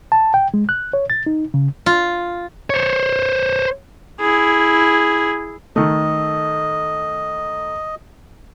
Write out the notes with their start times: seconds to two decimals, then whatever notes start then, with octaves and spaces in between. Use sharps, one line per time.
0.12 A5
0.34 G5
0.54 G#3
0.69 F#6
0.93 C#5
1.10 A6
1.26 D#4
1.54 C#3
1.86 F4
2.70 C5 C#5
4.20 E4 G#4
5.76 D#3 A3 D#5